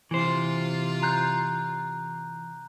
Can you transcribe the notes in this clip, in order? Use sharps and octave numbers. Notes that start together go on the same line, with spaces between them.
C3 E3 F4 C5
A#5 F#6 G6